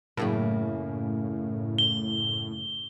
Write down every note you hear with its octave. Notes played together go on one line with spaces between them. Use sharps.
F#2 A2 C#3 A#3
G7